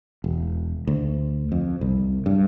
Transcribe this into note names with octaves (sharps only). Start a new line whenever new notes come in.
E1
D2
F2
C2
G2